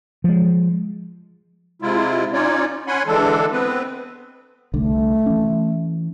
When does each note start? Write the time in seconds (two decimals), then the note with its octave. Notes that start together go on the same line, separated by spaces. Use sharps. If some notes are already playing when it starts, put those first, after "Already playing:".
0.24 F3 G#3
1.82 C3 G#3 E4 F4
2.33 C#4 D#4 F4 C#5 D5
2.87 C#4 C#5 F#5 G#5 B5 C6
3.07 D3 E3 G#3 D4 A4
3.52 B3 C4 B4
4.74 C2 D3 A3
5.26 E3 C#4